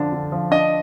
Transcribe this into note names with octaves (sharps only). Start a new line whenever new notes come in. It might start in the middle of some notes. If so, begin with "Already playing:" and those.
Already playing: D3 F3 D4
D3
F3
D4 D#5